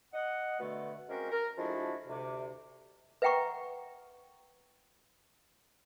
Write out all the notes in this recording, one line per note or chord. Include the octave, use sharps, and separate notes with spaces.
D#5 F#5
B2 D3 A3
G#3 A#3 C4 C#4 F#4 A#4
A#4
F3 G#3 A3 D4 E4 F#4
D2 C3
B4 E5 F#5 G5 A#5 C#6